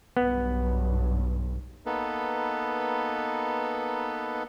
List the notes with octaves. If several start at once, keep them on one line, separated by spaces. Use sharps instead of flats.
B1 G2 B3
A#3 B3 D#4 A4 B4